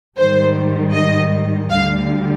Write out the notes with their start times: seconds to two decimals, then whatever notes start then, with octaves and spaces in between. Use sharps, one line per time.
0.17 G#2 D#3 G3 C5
0.93 D#5
1.70 D2 D3 G3 F5